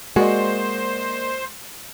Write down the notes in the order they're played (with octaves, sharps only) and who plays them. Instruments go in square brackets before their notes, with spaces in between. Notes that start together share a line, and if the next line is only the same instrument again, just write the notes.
[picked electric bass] G#3 [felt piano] A#3 D5 D#5 [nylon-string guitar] F#4 [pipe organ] C5